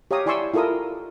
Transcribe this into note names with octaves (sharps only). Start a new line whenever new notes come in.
G4 C#5 F5 A#5 D#6
E4 D5 G#5 C6 C#6 E6
E4 F4 A4 A#4 D#6